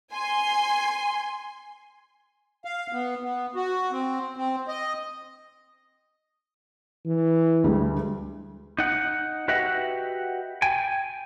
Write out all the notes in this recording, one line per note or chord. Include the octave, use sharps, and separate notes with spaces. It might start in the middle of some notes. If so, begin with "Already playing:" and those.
G#5 C6
F5
B3
B3
F#4
C4
C4
D#5
E3
D2 G3 G#3
D#4 F#5
F#4 G4 B4 D#5 E5 F#5
G5 G#5